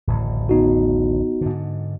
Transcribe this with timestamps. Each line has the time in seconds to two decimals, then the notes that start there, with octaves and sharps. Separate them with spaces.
0.07 D1 A1 C#3
0.49 B3 D#4 F#4
1.41 G#2 D3